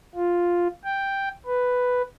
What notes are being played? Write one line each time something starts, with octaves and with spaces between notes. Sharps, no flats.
F4
G5
B4